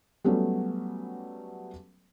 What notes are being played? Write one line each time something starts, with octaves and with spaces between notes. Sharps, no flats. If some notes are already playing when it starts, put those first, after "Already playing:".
F#3 G3 A3 B3 C#4